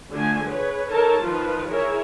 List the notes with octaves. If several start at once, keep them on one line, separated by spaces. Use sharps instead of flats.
D3 F3 A3 G#5
G#4 B4 C#5
D#4 A4 A#4 C#5 A5
D#3 F3 F4 B4
E4 G#4 A#4 C#5